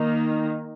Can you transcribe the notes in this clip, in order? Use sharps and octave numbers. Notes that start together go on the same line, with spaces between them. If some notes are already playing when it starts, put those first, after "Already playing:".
Already playing: D#3 A#3 D#4